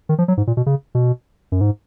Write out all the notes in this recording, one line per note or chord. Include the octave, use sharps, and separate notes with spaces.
D#3
F3
F#3
G#2
A#2
B2
C#3
B2
F#2
G#2